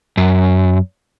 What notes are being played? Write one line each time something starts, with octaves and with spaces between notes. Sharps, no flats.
F#2